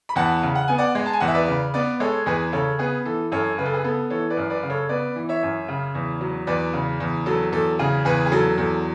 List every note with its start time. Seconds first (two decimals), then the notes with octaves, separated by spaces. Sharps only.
0.09 B5
0.16 E2 F#5 A5
0.43 C#3
0.55 F#5
0.68 B3 G#5
0.78 D5 F#5
0.95 G#3
1.06 A5
1.13 G#5
1.20 E2 F#5
1.28 E5
1.35 B4 D5
1.48 C#3
1.74 B3 B4 D5
2.00 G#3 A4 C#5
2.26 E2 G#4 B4
2.52 C#3 A4 C#5
2.79 B3 G#4 B4
3.05 E3 A4
3.32 F#2 A4 C#5
3.58 C#3 B4
3.66 A4
3.73 G#4 B4
3.84 B3 A4
4.10 E3 A4 C#5
4.30 B4 D5
4.37 F#2
4.50 B4 D5
4.63 C#3
4.70 A4 C#5
4.89 B3 B4 D5
5.16 E3
5.29 C#5 E5
5.43 F#2
5.68 C#3
5.95 E2
6.21 F#3
6.47 E2 B4 D5
6.73 C#3
7.00 E2
7.26 F#3 A4
7.52 E2 A4
7.79 C#3 G#4
8.05 E2 G#4 B4
8.26 G#4
8.32 F#3 A4
8.58 E2 A4